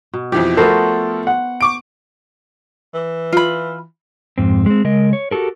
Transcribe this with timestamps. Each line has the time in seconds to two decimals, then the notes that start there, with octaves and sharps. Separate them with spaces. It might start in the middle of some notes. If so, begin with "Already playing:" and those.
0.13 B2
0.32 F2 E3 F3 G4
0.57 F3 A3 B3 F#4 A4 A#4 C5
1.27 F#5
1.61 C#6 D6 D7
2.94 E3
3.33 F4 B5
4.38 F2 G#2 C4
4.66 G#3 C4
4.84 C#3 G#3 A#4 D#5
5.13 C#5
5.31 F#4 G4 A4 A#4